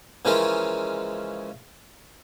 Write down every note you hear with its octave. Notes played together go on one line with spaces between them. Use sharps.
C#3 E3 F3 G#3 C#4 A#4